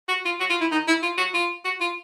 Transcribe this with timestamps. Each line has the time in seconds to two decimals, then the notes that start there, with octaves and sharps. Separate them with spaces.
0.09 F#4
0.25 F4
0.40 F#4
0.50 F4
0.61 E4
0.72 D#4
0.88 E4
1.03 F4
1.18 F#4
1.34 F4
1.65 F#4
1.81 F4